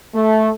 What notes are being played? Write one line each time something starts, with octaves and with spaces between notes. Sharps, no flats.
A3